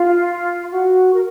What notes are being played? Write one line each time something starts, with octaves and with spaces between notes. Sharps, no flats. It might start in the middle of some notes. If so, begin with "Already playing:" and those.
Already playing: F4
F#4
A#4